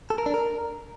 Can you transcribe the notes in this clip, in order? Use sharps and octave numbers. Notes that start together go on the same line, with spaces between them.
A4
A#4
D4
A#4